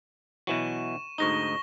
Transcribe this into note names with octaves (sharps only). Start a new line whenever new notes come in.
B2 E3 F#3 C#6 D#7 E7
D2 G#2 D#4 C#6 A#6 G7